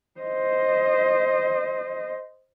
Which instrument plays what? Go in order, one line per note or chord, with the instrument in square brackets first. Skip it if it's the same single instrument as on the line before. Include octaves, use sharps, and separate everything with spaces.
[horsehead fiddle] C5 D#5